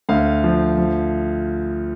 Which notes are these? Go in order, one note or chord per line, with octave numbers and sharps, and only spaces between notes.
D2 F5
F3
F3